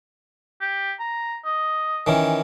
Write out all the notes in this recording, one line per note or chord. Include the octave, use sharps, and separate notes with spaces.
G4
A#5
D#5
D#3 E3 C#4